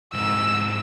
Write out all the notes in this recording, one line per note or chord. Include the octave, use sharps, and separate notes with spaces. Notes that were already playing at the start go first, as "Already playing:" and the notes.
C2 G#2 E6